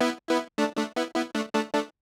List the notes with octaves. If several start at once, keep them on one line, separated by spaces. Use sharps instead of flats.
B3 E4
B3 E4
A3 D4
A3 D4
B3 E4
B3 E4
A3 D4
A3 D4
A3 D4